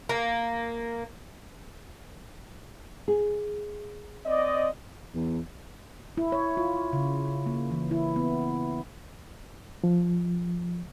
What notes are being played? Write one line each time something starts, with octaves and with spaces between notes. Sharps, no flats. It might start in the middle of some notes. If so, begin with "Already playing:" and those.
A#3
G#4
C4 D5 D#5
E2
E4
C#5
F4
C#3
A#3
E3
E4
B3
F3